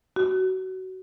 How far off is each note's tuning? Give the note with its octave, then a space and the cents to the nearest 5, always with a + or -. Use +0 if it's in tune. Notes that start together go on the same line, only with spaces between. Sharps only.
F#4 +20